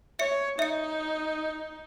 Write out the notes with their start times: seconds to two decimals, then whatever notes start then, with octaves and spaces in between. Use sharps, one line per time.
0.19 C#5 E5 C#7
0.59 D#4 E5 C#7